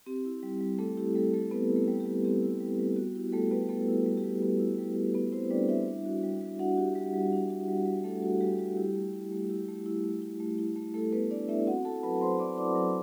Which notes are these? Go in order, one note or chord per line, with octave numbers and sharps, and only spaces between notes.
C4 G4
E4
G3
G3
A3 C4 A4
E4 G4
G3 A3 A4
G3 A3 A4
B3 C4 B4
E4
A3 A4
G3
G4
G3
C4 G4
E4
G3
G3
B3 F#4
E4 G4
G3 A3 A4
G3 B3 B4
A3 B3 A4
E4
G3
G4
G3
B3
E4
G3
G3
B3 B4
C4 E4 C5
G3 D4 D5
G3 E4 E5
D4
F#4
G3
G3
D4 F#4 F#5
F#4 G4
G3 G4
G3
D4
F#4
G3
G3
A3 D4 A4
F#4
G3 G4
G3 F#4
E4 G4
A3
E4
A3
E4 G4
A3
E4
A3
E4
A3
E4
A3
A3 E4 A4
A3 B3 B4
D4 E4 D5
A3 E4 E5
C4 F#4 F#5
E4 A4 A5
F#3 B4 B5
F#3 C5 C6
C4 D5 D6
E4 D5 D6
F#3